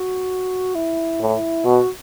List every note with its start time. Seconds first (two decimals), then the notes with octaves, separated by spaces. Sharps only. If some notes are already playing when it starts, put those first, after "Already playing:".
Already playing: F#4
0.75 E4
1.20 A2
1.65 B2 F#4